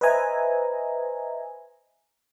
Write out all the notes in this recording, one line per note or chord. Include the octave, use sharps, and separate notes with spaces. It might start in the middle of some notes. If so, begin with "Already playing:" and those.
B4 C5 D#5 E5 G#5 A#5